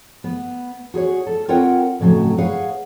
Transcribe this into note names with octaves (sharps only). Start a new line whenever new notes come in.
B3
F#4 G#4 C5 C#5
A4
C4 F4 A#4 C#5 F#5 G5
F2 A2 C#3 F#3 A3
G#4 B4 C#5 F5 F#5